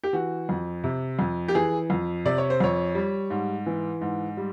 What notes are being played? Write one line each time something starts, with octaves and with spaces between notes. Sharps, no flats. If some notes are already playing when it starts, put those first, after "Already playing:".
G4
E3 F#4
F2
C3
F2
G4
E3 G#4
F2
C3 D5
C#5
C5
F2 C#5
G3
G#2
E3
G#2
G3